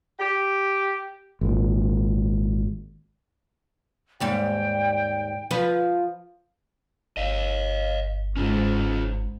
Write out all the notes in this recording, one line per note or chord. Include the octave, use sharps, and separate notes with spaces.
G4
G#1 A#2
D#2 G#2 G3 G5
F3 B4
G1 D#5 F5
G#2 C#4 F4